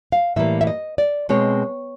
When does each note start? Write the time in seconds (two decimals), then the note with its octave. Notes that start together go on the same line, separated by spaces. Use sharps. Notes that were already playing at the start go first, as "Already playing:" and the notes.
0.12 F5
0.36 A2 E3 G3 A#3 E5
0.61 E5
0.67 D#5
0.98 D5
1.29 B2 G#3 C4 C#5